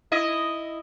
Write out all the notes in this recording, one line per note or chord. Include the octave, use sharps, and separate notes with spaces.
E4 D#5